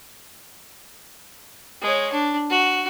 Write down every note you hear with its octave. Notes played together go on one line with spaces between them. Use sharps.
G#3 C#5
D4
F#4